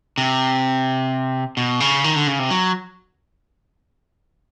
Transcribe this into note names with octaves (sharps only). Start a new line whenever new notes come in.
C3
B2
C#3
D#3
D3
C#3
C3
F#3